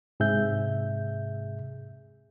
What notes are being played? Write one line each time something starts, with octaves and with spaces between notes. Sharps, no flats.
G#2 C3 G#4 E5 G6